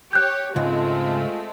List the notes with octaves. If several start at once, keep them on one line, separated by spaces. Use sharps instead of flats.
G4 C#5 F#6 G6
C#2 G#2 G#3 A3 C4 F4